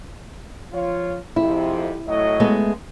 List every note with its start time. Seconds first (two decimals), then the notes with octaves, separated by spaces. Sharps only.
0.73 F3 F4 C#5
1.36 F2 G#2 C3 E4
2.08 A2 F#3 D#5
2.40 G#3 A3 B3